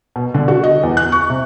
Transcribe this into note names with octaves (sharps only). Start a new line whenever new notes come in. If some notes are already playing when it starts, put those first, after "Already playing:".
B2
D3
F#4
D#5
E2
F#6
C#6
C3